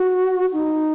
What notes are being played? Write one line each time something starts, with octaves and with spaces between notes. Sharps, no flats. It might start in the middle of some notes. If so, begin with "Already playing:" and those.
Already playing: F#4
D#4